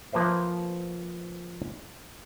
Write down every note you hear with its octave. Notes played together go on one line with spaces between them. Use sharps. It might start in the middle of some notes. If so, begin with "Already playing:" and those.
F3 A#3 B4 C5 E5